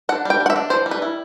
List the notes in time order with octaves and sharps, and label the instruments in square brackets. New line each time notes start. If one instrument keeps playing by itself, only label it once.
[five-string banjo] D4 F#5
G3 G5
D4
F#5
E5
D4
E3 C5
G3
B4
E4